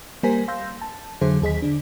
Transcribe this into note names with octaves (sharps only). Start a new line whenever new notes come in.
G3 A#3 A#4 C5 G#5 B6
F5 C6 E6 G6 A#6
A5
F2 D3 F#3 G#4 C5 E5
D#2 G#4 D#5 B6
D3 D4